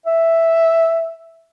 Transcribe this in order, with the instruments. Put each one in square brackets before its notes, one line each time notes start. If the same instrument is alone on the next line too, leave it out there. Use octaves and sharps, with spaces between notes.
[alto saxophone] E5